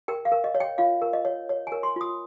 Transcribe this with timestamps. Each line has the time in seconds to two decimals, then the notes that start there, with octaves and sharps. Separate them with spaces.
0.08 A#4 G5
0.25 F5
0.32 A#4
0.44 D#5
0.55 C#5
0.60 G5
0.78 F4 F5
1.02 A#4
1.13 D#5
1.25 C#5
1.49 C#5
1.67 G#5
1.72 A#4
1.83 C6
1.96 F4 D#6